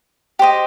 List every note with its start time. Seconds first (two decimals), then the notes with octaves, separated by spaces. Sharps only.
0.39 G4 C5 D#5